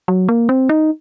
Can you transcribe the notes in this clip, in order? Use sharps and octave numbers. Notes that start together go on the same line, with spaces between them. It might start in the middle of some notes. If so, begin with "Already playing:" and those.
F#3
A#3
C4
D#4